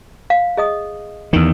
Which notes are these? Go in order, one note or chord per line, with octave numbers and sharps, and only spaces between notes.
F5
G#4 D#5 D#6
E2 D#3